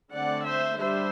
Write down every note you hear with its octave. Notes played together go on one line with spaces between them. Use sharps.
D3 A3 C4 D5 F#5
C5 E5
G3 D4 C5 E5